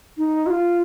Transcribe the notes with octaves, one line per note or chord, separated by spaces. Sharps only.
D#4
F#4
F4